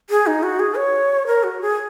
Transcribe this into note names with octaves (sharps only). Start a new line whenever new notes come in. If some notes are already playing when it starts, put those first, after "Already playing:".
G#4
D#4
F#4
G#4
C#5
A#4
F#4
G#4